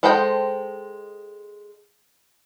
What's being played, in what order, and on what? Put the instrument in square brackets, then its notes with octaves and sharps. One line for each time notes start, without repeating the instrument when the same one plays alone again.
[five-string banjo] G#3 A4 C5 D#5 G5